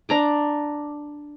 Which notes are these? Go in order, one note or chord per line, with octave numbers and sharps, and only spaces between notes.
D4 A#5 D6